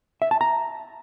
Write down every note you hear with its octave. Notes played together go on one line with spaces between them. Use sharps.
E5
A5
A#5